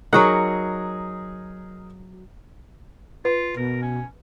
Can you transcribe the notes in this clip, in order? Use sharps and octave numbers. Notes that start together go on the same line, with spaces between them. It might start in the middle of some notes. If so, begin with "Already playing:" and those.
F#3 D#4 F#4 G#4 A#4 F#5
F4 B4
B2 A#4
C#4